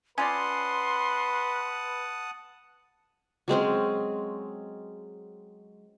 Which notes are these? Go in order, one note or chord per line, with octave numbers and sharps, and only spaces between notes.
C#4 F4 B4 D5 F#5 A5 C6 D#6
F#3 G#3 C4 C#4